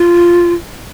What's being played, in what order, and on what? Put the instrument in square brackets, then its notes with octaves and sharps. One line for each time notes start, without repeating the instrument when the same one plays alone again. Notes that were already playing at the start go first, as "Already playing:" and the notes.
Already playing: [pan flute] F4